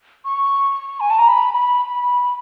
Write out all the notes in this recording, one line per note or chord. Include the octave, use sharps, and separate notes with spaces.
C#6
G#5
A5
A#5
B5
B5